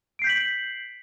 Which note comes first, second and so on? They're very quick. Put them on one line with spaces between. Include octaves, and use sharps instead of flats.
D7 C7 G6 B6 F#7